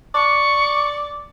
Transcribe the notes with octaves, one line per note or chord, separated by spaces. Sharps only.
D5 C#6